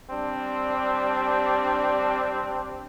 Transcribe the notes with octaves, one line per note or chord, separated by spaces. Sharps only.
G3 C4 D4